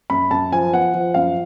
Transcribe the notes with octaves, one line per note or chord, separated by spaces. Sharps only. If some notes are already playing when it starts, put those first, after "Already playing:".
F#2 B5
F#2 A5
F3 G#5
B3 F#5
F3
F#2 F5